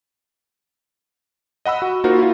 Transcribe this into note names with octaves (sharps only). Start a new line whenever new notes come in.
D#5 F#5 B5 E6
F#4
A#3 D#4 F4 F#4 A#4 C5
E4 F4